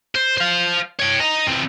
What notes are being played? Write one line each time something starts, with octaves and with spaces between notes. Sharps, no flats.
C5
C5 F5
C#5 G5
D#5 A#5
E3 C4